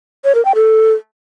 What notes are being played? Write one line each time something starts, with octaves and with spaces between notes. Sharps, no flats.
C#5
A#4
G5
A4